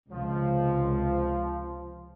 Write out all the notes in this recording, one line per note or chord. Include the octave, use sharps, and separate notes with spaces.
C#2 C3 F3